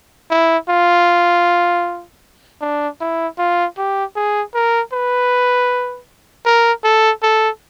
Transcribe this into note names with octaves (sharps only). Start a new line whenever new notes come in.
E4
F4
D4
E4
F4
G4
G#4
A#4
B4
A#4
A4
A4